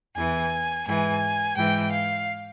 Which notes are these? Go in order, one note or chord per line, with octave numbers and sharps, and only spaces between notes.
E2 E3 G#5
G#2 E3 G#5
G#2 E3 G5
F5